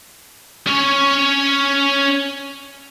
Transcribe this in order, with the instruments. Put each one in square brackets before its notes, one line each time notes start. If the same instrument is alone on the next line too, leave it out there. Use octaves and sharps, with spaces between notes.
[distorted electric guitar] C#4 C#5